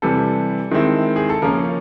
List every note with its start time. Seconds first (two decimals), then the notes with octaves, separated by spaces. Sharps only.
0.02 C3 E3 G3 A4
0.71 D#3 G#3 C4 E4
1.16 G#4
1.30 A4
1.42 C#3 F3 A#3 C#4 A#4